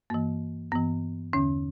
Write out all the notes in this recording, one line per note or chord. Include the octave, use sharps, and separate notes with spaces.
G2 E3 A#3
G2 E3 B3
E2 D3 C#4